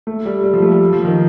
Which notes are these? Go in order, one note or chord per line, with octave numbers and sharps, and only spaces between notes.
A3
G3
G3
F3
A3
G3
F3
D#3